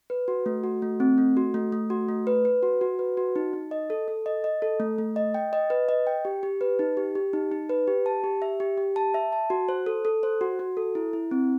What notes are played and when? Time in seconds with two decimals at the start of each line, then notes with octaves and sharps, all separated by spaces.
0.10 B4
0.28 F#4
0.46 A3
0.64 F#4
0.82 A3
1.00 C4
1.18 A3
1.37 F#4
1.54 A3
1.72 A3
1.90 F#4
2.09 A3
2.27 B4
2.45 B4
2.63 F#4
2.81 F#4
2.99 B4
3.17 F#4
3.36 D#4
3.53 D#4
3.71 D#5
3.90 A4
4.08 A4
4.26 D#5
4.44 D#5
4.62 A4
4.80 A3
4.98 A3
5.16 D#5
5.34 G5
5.53 D#5
5.70 B4
5.89 D#5
6.07 G5
6.25 G4
6.43 G4
6.61 B4
6.79 D#4
6.97 G4
7.15 G4
7.33 D#4
7.52 D#4
7.70 B4
7.87 G4
8.06 A5
8.24 G4
8.42 E5
8.60 G4
8.78 G4
8.96 A5
9.14 E5
9.32 A5
9.50 F#4
9.69 C5
9.86 A4
10.05 A4
10.23 C5
10.41 F#4
10.59 F#4
10.77 A4
10.95 E4
11.13 E4
11.31 C4